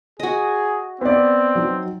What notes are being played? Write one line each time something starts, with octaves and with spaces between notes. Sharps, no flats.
F#4 G#4 D#5
B3 C4 D5
F#3 D#4